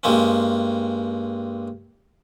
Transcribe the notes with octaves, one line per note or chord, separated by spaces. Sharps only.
G2 G#3 A#3 C4 C#4